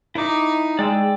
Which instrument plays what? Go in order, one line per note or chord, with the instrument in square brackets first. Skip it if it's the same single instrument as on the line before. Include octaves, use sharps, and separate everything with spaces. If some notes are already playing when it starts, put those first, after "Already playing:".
[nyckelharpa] D#4 [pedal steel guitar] E4 D6
[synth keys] G#3 [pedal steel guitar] D5 G5 E6